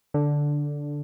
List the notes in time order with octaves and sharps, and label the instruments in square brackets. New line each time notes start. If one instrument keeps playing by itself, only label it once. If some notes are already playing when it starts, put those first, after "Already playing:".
[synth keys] D3